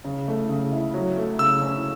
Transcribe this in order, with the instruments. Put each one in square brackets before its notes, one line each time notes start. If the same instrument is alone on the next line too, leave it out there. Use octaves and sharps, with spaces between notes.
[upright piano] C#3
A3
C#3
E4
F#3
A3
[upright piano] C#3 [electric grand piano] E6
[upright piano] C#4